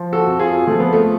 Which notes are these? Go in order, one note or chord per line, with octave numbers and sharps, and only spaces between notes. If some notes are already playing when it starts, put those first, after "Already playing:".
Already playing: F3
F#4 A4
F2
F4 G#4
F3 A3
B3
A3